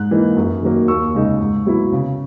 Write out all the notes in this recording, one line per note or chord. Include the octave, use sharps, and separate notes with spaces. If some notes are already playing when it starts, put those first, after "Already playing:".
Already playing: G#2 F#6
E3 A#3 D#4
F#2
D#3 F#3 A#3
D#2 C#6 E6
C#3 G#3 D#4
G#2
F#3 B3 E4
C#3